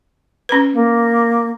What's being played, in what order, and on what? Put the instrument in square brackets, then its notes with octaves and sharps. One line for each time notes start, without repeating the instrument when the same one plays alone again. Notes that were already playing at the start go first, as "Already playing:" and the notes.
[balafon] C#4 B4
[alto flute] A#3